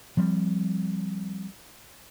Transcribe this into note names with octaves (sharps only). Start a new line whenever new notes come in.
F3 G3 C4